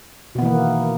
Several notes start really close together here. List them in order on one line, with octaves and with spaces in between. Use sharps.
B2 B3 E3 A#3 D#3